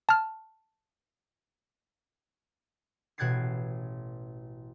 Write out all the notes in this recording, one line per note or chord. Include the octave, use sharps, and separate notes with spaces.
A5 F6
A1 B2 F#6 G#6 A6 C7